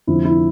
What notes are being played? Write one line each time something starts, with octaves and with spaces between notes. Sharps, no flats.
F1 F2 D3 F3 E4
E4